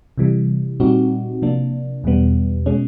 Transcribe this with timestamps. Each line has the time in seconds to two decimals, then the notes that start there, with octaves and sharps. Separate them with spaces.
0.18 C3 E3 G3
0.80 A#2 G3 C4 D#4 F#4
1.42 C3 F3 A#3 D4
2.04 E2 B2 G3 B3
2.66 B2 G#3 C#4